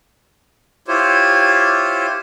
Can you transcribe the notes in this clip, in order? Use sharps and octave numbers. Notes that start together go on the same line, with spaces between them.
E4 F4 G4 C5 C#5